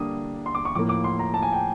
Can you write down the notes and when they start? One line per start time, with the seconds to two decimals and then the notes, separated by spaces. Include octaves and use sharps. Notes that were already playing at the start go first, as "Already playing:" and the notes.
Already playing: D3 G3 A#3 D4 D#6
0.46 C6
0.55 D6
0.65 C#6
0.75 A2 F3 A#3 D6
0.89 D6
1.04 C6
1.19 A#5
1.34 A5
1.43 G#5
1.53 G5